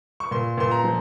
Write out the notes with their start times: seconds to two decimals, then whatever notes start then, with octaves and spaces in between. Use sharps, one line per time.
0.20 C#6
0.31 A#2 C6
0.58 A#2 C6
0.71 A#5
0.84 F3